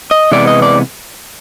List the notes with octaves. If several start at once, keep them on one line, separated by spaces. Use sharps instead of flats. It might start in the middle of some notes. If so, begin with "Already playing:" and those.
D#5
C3 E3 G#3 B3 D5
D#5
D5